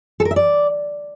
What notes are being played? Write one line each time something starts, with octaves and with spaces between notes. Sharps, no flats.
A4
A#4
E5
D5